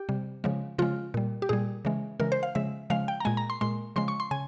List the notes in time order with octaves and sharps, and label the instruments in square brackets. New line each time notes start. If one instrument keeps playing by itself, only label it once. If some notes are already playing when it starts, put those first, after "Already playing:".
Already playing: [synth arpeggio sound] G4
C3 G3
C#3 F3 G#3
C#3 F3 G#3 F4
A#2 G3
G4
A#2 G3 G#4
C#3 E3 G#3
C#3 E3 G#3 A#4
C5
F5
C#3 F3 G#3 E5
C#3 F3 G#3 F5
G5
A#5
A#2 G#3 G#5
A#5
C6
A#2 G#3 C6
C#3 F3 G#3 C6
C#6
C6
C#3 G#5